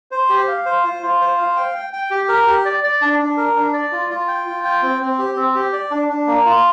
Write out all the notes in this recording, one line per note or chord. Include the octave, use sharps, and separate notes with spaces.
C5
G4
F5
C5
F4
F4
C5
F5
G5
G5
G5
G4
A#4
G4
D5
D5
D4
D4
A#4
D4
D5
F4
F4
G5
F4
G5
C4
C4
G4
C4
G4
D5
D4
D4
A#3
F4